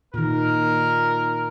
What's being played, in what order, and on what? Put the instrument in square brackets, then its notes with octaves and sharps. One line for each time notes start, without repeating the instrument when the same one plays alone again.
[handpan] A#2 D#3 [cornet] A#4